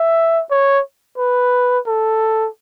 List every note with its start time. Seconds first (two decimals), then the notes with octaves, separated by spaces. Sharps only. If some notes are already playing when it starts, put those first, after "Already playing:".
Already playing: E5
0.51 C#5
1.18 B4
1.87 A4